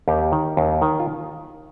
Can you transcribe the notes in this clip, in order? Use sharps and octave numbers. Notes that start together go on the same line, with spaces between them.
D#2 G4
D#3
D#2
D#3
F4